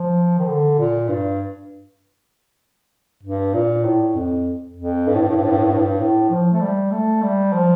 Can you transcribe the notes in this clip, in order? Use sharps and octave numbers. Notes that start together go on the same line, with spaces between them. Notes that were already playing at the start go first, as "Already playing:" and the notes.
Already playing: F3
D#3
D3
A#2
G2
G2
A#2
A2
F2
F2
G2
A2
G2
A2
G2
A2
G2
A2
G2
A2
G2
A2
F3
A3
G3
A3
G3
F3